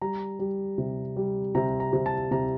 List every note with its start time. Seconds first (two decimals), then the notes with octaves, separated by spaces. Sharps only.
0.02 G3 A#5
0.39 G3
0.78 C3
1.16 G3
1.55 C3 A#5
1.80 A#5
1.93 C3
2.06 A5
2.31 C3 A#5